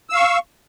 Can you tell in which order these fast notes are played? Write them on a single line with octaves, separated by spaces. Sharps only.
E6 F5 C#6